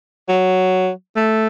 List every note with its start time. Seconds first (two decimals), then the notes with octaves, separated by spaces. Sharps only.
0.29 F#3
1.16 A3